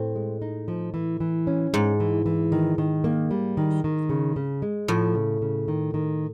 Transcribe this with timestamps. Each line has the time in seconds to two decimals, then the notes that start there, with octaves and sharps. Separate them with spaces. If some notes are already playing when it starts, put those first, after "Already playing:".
Already playing: A2 C4
0.16 G#3
0.42 D#4
0.68 F3
0.94 E3
1.20 E3
1.47 C#4
1.73 G#2 G#3
2.00 E3
2.26 E3
2.52 D#3
2.78 D#3
3.04 A#3
3.31 G3
3.57 D#3
3.84 D#3
4.09 C#3
4.36 C#3
4.62 G#3
4.88 A2 F3
5.15 C#3
5.42 C#3
5.68 D#3
5.94 D#3